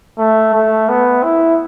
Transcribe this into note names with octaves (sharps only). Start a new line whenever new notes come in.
A3
A3
B3
E4